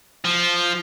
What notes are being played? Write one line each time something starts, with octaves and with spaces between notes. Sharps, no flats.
F3